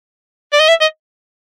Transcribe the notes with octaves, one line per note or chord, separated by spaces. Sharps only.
D5
D#5
E5
D#5